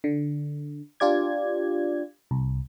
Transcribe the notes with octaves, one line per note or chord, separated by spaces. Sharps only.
D3
D4 F4 G4 D5 G#6
C2